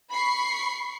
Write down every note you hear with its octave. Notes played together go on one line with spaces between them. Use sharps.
B5 C#6 C7